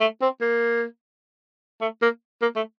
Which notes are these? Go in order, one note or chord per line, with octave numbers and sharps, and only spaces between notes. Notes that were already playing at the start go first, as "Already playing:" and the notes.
A3
C4
A#3
A3
A#3
A#3
A3